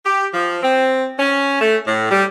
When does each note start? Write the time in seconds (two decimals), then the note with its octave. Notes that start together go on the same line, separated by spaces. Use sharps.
0.05 G4
0.33 F3
0.62 C4
1.18 C#4
1.61 A3
1.86 A2
2.11 G3